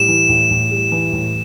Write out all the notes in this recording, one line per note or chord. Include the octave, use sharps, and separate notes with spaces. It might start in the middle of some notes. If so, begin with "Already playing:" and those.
Already playing: A2 G3 E7
E3
A2
A2
G3
E3
A2